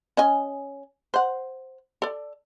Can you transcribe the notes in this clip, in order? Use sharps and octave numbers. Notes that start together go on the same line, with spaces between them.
C#4 D#5 G#5
C5 F#5
A4 D5